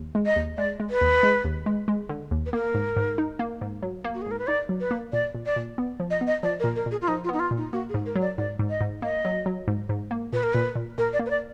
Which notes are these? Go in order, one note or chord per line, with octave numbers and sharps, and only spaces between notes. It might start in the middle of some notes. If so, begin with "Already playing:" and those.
Already playing: D#2
G#3
D#5
D#2
G#3 D5
G#3
B4
D#2
G#3
D#2
G#3
G#3
D3
D#2
B4
A#3 A#4
G#2
G#2
D#4
A#3
G#2
F#3
A#3
F#4
G#4
G#2 A#4
B4
D#4 D5
F#3
B4
A#3
A#2 D5
A#2
D5
A#2
B3
F3
D#5
B3
D#5
F3 D5
A#4
A#2
A#4
A#2
G#4
F4
F3 D#4
F4
B3 D#4
F4
A#2
D#4
A#3 F#4
G#4
G#2
A#4
F#3
D5
G#2 D5
G#2
D#5
G#2
A#3 D#5
F#3
F#3
G#2
G#2
A#3
A#2 B4
A#4
A#2 B4
A#2
A#2 A#4
D5
A#3
B4
D5